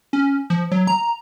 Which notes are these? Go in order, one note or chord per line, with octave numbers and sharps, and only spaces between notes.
C#4
F3
F#3
A#5